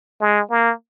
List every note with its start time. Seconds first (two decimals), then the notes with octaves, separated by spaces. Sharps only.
0.21 G#3
0.51 A#3